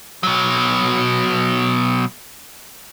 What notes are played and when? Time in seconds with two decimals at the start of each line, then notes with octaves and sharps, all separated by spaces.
0.23 B2 F#3